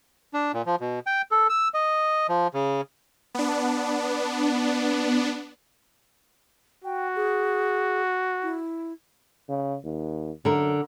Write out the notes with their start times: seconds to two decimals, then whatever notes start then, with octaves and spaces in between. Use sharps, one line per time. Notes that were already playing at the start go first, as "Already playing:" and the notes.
0.34 D4
0.54 A#2
0.66 F3
0.80 B2
1.07 G5
1.31 A4
1.49 E6
1.74 D#5
2.29 F3
2.54 C#3
3.35 B3 D4
6.84 F#4 G5
7.16 G#4
8.43 E4
9.49 C#3
9.84 D#2
10.45 F#2 D3 A#4